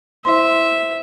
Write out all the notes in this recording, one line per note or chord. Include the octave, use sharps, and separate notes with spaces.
E4 C5 E5 C6